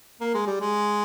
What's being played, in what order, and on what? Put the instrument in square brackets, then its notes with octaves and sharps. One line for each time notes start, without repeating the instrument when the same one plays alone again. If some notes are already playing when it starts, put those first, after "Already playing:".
[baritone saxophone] A#3
G#3
G3
G#3